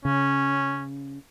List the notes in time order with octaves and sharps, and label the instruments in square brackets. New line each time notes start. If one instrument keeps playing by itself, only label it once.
[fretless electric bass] C#3 [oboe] C#4